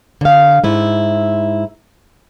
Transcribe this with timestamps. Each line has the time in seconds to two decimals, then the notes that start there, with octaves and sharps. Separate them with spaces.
0.21 D3 F5
0.64 G#2 E4